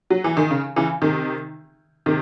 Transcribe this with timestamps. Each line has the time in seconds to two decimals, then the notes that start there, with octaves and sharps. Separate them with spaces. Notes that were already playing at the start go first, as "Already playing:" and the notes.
0.10 F#3
0.24 E3
0.37 D#3
0.51 C#3
0.76 C#3 E3
1.02 C3 D#3
2.06 C3 D#3